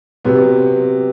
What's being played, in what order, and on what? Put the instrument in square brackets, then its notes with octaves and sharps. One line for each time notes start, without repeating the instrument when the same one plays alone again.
[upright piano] C3 F#3 B3